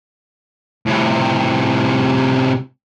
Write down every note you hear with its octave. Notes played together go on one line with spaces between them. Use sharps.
A2 C3